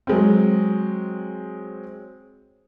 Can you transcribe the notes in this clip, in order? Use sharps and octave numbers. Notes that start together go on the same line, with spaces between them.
F#3 G#3 C4